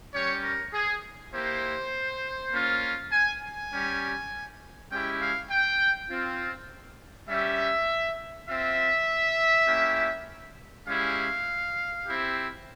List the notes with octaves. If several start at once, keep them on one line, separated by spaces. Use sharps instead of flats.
G3 C#4 G4 C#5
A#4
G#4
A#3 E4 G4 C5
A#3 C#4 F4
G#5
G#5
G3 C#4 G4
G#3 C#4 E4 G4 G5
F5
G5
C4 F4
G3 C#4 G4 E5
C4 F4 E5
A#3 C#4 E4 G4
G#3 C#4 E4 G4 F5
C4 E4 G4